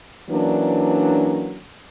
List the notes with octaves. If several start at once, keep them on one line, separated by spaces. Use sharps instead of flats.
E3 F#3 A#3 C#4 D4